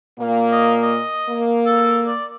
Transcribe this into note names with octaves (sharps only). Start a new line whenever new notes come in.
A#2 A#3
D#5
D#5
A#3
A4
D5